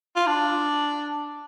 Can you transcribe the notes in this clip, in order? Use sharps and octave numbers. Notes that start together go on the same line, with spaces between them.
F4
D4